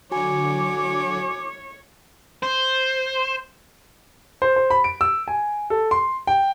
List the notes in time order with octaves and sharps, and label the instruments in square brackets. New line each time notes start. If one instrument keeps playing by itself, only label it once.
[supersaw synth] D3 F#3 [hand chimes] F#4 G#5 [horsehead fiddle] C#5 [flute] D6
[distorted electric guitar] C5
[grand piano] C5
C5
B5
D7
E6
G#5
A4
C6
G5